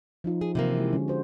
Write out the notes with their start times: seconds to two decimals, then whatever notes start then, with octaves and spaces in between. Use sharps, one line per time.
0.24 F3 D#4 F4
0.41 G#4
0.55 C3 E3 A#3
0.77 G#3 G4
0.93 D3 G#3 C#4
1.08 F#4 C5